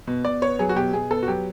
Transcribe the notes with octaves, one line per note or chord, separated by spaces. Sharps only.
B2
B2 D5
B3 C#5
F#3 G#4
F#4
B2 G4
B2 G#4
B3 A4
F#4
F#3 G4